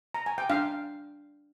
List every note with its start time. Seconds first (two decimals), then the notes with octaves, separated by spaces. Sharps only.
0.14 A#5
0.26 G#5
0.38 G5
0.50 D4 F5